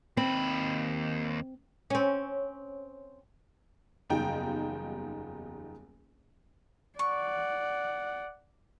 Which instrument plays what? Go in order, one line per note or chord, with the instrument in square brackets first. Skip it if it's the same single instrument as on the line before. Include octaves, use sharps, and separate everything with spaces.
[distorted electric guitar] D#2 B5 [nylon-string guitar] C4
[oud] C4 C#4
[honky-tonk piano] F#1 E2 G3 D#4 F4 G5
[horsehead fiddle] D5 F#5 [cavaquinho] C#6